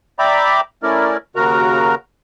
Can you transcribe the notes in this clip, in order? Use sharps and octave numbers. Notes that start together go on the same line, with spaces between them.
D5 E5 G5 A#5 B5 D6
A3 C#4 E4 A#4 D5
D#2 C#3 F#4 A#4 A#5